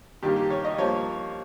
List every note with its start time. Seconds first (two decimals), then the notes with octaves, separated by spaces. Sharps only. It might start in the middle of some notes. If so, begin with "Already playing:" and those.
0.23 G2 D#3 A#3 G4
0.36 G4
0.50 C#5
0.65 D#5
0.78 G2 F3 A#3 C#5